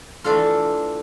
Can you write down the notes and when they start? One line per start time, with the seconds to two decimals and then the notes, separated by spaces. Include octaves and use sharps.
0.24 E3 A3 D4 F4 A4